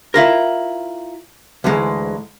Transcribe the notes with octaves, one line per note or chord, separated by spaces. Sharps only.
E4 F4 A#4
D2 G#2 E3 G#3